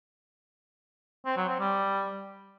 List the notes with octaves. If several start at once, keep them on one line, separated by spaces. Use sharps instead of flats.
C4
F#3
C4
G3